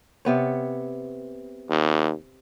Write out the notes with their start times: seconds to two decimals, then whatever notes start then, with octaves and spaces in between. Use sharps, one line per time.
0.25 C3 B3 C#5
1.70 D#2